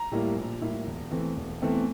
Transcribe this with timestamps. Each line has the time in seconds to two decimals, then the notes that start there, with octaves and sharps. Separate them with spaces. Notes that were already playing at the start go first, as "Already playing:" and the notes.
Already playing: A#5
0.11 A2 G3 A#3 E4
0.36 A#1
0.61 A2 G3 A#3 E4
0.87 E1
1.11 E2 E3 A3 C4
1.36 E1
1.62 E2 E3 A3 C4